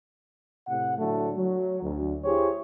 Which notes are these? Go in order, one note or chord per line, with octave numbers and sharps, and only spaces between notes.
A2 C3 F#5
A2 D3 F#3 A3
F#3
D2
E4 G4 G#4 C5 C#5